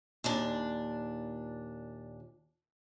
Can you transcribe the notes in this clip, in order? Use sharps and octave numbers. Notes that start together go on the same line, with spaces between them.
D#2 A#2 D4